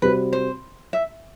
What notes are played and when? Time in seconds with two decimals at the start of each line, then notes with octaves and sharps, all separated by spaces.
0.02 C3 G3 C4 F#4 B4
0.33 C5
0.93 E5